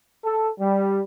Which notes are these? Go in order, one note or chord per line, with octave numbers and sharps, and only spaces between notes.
A4
G3